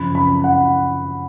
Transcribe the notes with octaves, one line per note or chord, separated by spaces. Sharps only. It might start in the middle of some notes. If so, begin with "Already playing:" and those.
Already playing: F#2 C#3 F3 B5
B5
F#5